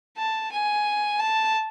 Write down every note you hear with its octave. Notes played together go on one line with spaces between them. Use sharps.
A5
G#5
A5